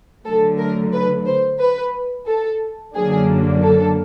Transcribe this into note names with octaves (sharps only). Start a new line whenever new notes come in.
D3 F#3 A3 A4
A#4
B4
C5
B4
A4
F#2 D3 F#3 A#3 D4 G#4
A4